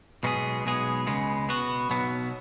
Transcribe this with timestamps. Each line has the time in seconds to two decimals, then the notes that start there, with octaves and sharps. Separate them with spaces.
0.23 B1 B2 G#3 B3 G#4
0.64 B1 B2 G#3 B3 G#4
1.07 C#2 C#3 G#3 B3
1.48 B2 B3 F#4
1.90 B1 B2 F#3 B3